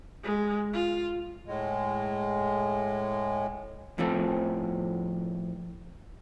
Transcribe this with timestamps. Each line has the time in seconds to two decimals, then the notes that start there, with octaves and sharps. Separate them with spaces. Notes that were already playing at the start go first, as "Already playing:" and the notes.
0.23 G#3
0.73 F4
1.47 A2 G#3
3.98 F2 A2 F3 A3 C4